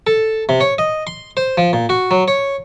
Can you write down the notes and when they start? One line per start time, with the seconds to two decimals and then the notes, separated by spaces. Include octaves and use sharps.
0.07 A4
0.49 C3
0.61 C#5
0.78 D#5
1.07 C6
1.37 C5
1.58 F3
1.73 A#2
1.89 F#4
2.11 F#3
2.28 C#5